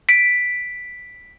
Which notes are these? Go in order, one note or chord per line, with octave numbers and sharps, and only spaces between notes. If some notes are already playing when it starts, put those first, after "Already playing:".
B6 D7